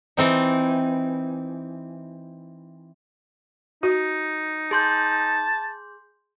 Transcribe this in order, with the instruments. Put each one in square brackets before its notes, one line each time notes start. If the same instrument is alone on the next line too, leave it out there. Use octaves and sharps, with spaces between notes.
[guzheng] E3 C4 D#4
[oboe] D#4 [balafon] F#4
[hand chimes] G#4 C6 G6 [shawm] A5